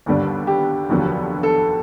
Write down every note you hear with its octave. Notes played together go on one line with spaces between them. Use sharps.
D#2 D3 G3 B3 D4
G4
F1 D#2 D3 F#3 B3
A4